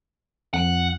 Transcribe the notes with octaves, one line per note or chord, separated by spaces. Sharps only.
F2 F#5